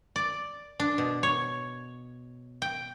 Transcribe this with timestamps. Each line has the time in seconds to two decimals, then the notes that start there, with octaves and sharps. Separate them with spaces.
0.16 D5
0.80 D4
0.98 B2
1.23 C#5
2.62 G5